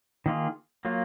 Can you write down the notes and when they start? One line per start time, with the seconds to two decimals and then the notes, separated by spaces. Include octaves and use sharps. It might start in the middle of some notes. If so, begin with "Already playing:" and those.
0.26 D#3 A#3 F4 G#4
0.85 F#3 A#3 F4